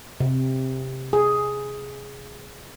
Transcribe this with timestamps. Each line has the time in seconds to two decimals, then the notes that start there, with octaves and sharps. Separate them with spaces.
0.20 C3
1.13 G#4